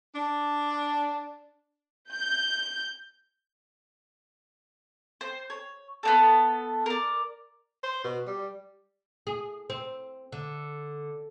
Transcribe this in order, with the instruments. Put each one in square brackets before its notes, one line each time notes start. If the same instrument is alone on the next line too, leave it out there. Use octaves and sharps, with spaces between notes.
[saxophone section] D4
[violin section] G6
[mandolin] C5
C#5
B3 C4 A4
A#4 D5
[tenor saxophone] C5
B2
G3
[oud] G#4
C4
D3